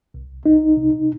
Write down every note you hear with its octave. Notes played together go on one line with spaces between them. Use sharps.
C2
C2 D#4
C3